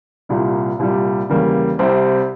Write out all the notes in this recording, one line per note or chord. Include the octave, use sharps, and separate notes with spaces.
C2 A#2 G3
C2 A#2 G3
E2 C#3 G3 A#3
C2 C3 G3 C4